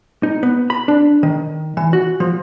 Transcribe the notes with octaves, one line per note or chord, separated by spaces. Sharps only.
D#4
B3
B5
D4
D#3
E3
F#4
F3